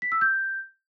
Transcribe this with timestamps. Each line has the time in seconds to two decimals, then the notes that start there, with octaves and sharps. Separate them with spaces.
0.02 B6
0.12 E6
0.21 G6